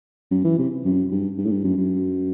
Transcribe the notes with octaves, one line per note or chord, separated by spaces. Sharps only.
F#2
E3
C3
F#2
G2
G2
A2
G2
F#2
F#2